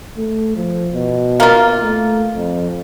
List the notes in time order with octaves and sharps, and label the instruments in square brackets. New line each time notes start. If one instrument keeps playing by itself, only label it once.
[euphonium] A3
F3
B2
[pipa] A#3 F4
[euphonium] A3
F2